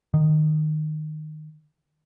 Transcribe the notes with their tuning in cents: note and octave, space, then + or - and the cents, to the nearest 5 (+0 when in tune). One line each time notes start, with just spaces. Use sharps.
D#3 -15